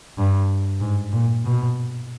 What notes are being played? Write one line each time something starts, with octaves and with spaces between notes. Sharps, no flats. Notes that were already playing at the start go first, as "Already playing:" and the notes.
G2
G#2
A#2
B2